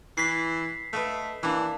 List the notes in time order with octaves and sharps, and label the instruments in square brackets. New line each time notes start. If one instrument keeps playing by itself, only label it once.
[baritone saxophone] E3 [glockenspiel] B6 C7
[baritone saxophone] A3 [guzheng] B4 D#5 F5
[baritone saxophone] E3 [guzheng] A#3 D4